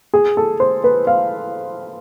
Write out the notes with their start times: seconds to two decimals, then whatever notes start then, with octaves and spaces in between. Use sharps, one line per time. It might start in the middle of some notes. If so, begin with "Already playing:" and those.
0.14 G#4
0.37 A4
0.60 C5
0.84 B4
1.07 F5